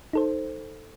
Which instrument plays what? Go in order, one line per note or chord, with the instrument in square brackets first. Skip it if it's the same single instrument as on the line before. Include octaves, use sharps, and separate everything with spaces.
[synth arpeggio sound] D#4 A4 C5